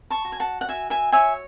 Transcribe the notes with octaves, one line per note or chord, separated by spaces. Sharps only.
A5 C#6
F#4
G#5
F#5 A5
F#5
F#4 E5 G#5
E5 G#5
C#5 E5 G#5